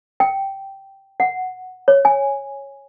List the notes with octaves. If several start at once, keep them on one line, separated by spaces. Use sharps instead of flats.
G5
F#5
C#5
G#5